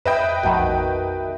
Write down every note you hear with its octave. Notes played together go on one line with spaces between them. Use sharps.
F2 B4 D#5 E5 G5
A#1 F2 B2 D#3 F3